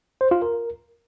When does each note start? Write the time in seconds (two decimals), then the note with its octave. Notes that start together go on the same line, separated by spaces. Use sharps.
0.21 C5
0.31 F4
0.42 A#4